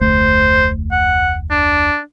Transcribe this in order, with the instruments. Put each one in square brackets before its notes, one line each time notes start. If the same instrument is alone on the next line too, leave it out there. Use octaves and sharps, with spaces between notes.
[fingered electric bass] F1 D2 A3 [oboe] C5
[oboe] F#5
D4